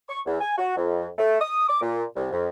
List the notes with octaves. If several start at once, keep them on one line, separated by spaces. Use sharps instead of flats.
C#6
E2
G#5
F#4
F2
A3
D#6
D6
A#2
C2
F2